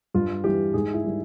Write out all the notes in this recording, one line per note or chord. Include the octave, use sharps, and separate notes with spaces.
G2 F4
E3 G3 G4
G#2 G#4
E4
D#3 G3